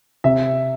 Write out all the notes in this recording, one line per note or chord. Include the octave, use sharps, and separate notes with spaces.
C3 E5